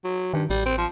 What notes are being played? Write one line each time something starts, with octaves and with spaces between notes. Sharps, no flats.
F#3
G2 D#3
A1 G3
C4
F3